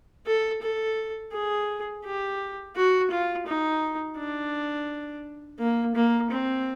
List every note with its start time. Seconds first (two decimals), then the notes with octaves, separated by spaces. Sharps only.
0.26 A4
0.62 A4
1.33 G#4
2.05 G4
2.76 F#4
3.11 F4
3.47 D#4
4.17 D4
5.60 A#3
5.95 A#3
6.31 C4